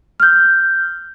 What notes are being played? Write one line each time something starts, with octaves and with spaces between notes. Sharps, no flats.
F6 G6